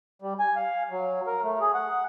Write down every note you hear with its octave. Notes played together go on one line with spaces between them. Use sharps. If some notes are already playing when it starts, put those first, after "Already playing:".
G3
G#5
F5
F#3
A#4
A3
G#4
F#5